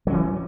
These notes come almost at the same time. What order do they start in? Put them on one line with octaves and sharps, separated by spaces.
F#3 C#4 E3